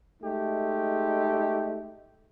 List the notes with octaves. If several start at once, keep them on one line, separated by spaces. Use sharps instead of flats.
G#3 A3 D#4 G4